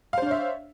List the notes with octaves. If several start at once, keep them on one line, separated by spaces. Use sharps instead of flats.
D4 C5 C#5 E5 F5